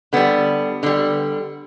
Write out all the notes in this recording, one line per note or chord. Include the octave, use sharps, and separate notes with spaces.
D3 G3 B3
D3 G3